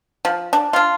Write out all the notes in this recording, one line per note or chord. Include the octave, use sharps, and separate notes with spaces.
F3
D4
D4 F4